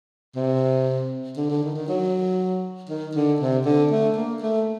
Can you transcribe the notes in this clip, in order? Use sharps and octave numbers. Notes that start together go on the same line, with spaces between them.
C3
D3
D3
D#3
D#3
F#3
D#3
D3
C3
D3
A3
A#3
A3